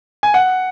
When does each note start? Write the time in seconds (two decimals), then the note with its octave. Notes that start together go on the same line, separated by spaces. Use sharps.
0.23 G#5
0.34 F#5